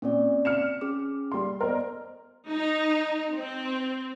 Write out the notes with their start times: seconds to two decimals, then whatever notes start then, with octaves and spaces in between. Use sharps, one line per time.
0.02 A#2 C4 C#4 D5
0.45 F6 C#7 E7
0.81 C#4 G#4 D6
1.32 G3 C6
1.61 B3 A#4 C5 D5 D#5
2.51 D#4
3.34 C4